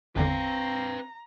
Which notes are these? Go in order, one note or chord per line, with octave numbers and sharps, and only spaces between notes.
G#1 E2 D3 C4 B4 F5 A#5